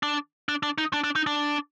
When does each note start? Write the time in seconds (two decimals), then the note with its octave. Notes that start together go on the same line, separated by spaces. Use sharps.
0.03 D4
0.49 D4
0.63 D4
0.78 D#4
0.93 D4
1.04 D4
1.16 D#4
1.27 D4